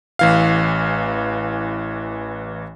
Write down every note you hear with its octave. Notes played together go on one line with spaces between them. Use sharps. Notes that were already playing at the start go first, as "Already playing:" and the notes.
A1 E3 F5